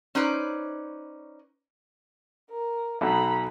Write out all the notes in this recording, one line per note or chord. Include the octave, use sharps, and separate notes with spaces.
C#4 D#4 B4 C5 D5
A#4
B1 B2 A4 A#5 B5